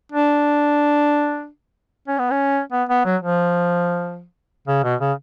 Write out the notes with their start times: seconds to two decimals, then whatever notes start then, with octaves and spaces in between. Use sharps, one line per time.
0.12 D4
2.08 C#4
2.19 B3
2.31 C#4
2.72 B3
2.89 B3
3.05 F#3
3.22 F3
4.68 C#3
4.84 B2
5.01 C#3